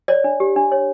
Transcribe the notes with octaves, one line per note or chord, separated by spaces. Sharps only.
C#5 D5
D4
G4
D4
C#5